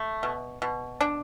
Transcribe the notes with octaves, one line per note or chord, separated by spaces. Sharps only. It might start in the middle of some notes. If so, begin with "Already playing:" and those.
Already playing: A3
B2
B2
D4